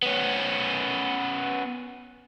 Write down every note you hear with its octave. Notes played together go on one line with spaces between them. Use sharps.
B3 C#4